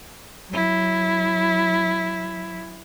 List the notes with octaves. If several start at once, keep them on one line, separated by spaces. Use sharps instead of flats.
F#3 E4